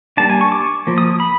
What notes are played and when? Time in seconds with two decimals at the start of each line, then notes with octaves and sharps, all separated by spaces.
0.17 G3 A#3 D4 A5
0.30 G#5
0.41 C#6
0.52 D6
0.87 F3 A#3
0.98 D#6
1.20 B5